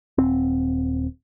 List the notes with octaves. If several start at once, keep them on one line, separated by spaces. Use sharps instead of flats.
D#1 C4